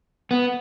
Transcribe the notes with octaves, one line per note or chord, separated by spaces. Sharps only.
B3